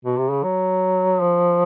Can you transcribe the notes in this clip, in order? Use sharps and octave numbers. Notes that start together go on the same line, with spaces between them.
B2
C3
C#3
F#3
F3